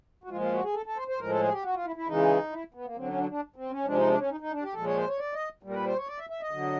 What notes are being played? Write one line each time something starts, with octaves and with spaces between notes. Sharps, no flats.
F#4
A#2 F3 G#3 F4
F4
F#4
G#4
A4
A4
C5
C5
A2 F3 G#3 A#4
A4
G#4
G4
F#4
F4
E4
E4
C#3 E3 G#3 D#4
E4
B3
A#3
D3 F#3 C4
C#4
D4
D4
C4
C#4
C3 F3 G#3 D4
D#4
D4
C#4
D#4
D#4
D4
G4
A#2 F3 G#3 A4
C#5
C5
C#5
D5
D#5
A#2 G3
A#4
B4
C5
C#5
D5
E5
E5
D#5
D3 F#3